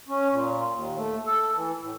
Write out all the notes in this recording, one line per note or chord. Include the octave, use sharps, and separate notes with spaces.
C#4
A#2
D#2
A3
A4
E3
A2